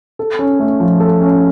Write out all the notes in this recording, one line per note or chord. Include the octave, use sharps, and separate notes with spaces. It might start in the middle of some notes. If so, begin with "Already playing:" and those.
A4
C#4
A3
F3
A4
C#4